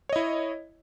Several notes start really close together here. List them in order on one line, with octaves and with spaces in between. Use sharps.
C#5 D#5 E4